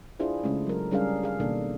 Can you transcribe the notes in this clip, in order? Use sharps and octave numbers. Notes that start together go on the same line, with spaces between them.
D4 E4 F4 G#4 C5
C#3 G#3 A3 C#4
F#3 A#4
G3 C#4 D4 G#4 A#4 F5
G#4 F5
B2 D#3 A#3 D4 A4